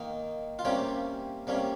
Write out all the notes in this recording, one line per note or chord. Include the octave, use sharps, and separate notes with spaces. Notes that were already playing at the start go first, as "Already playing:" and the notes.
Already playing: D#3 A#3 D#4
F4
C3 G3 A#3 C#4 G4
C3 G3 A#3 C#4